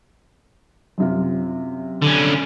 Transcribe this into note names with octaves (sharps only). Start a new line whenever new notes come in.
F#2 C3 F4
D3 C#4